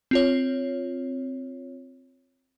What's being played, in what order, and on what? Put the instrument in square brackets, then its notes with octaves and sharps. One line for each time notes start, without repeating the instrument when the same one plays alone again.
[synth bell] C4 F4 C#5